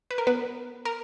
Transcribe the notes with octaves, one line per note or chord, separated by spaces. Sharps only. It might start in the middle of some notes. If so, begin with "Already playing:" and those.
B4
A#4
B3 B4
A#4